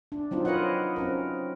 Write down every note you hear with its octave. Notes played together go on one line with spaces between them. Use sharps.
D4
F#3 C4 D#4 F4
F4 A#4 B4 C#5 D#5 F#5
C4 C#4 A#4